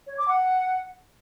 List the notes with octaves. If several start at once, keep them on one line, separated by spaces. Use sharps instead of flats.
C#5
D6
F#5